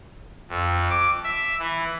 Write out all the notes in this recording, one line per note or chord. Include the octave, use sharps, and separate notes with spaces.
F2
D6
E5
E3